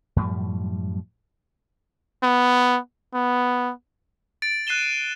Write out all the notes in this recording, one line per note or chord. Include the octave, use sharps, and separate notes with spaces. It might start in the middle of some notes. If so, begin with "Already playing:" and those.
F#2 A2 F3 G3
B3
B3
A6 D7
F#6 C7 D#7 E7 G7